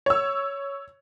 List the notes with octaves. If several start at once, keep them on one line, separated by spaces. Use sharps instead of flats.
C#5 E6